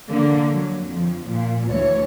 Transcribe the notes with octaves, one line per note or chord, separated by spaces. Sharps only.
D3 A#3
F#3
F2 F3
A#2
D2 E3 C#5